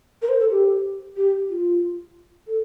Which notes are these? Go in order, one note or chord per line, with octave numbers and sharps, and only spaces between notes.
A#4
C5
A4
G4
G4
F4
A4